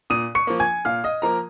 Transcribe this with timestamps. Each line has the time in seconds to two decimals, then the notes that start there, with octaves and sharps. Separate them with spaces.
0.10 A#2 D#6 D#7
0.35 C#6 C#7
0.47 F3 A#3
0.60 G#5 G#6
0.85 A#2 F5 F6
1.04 D#5 D#6
1.22 F3 A#3 A#4 A#5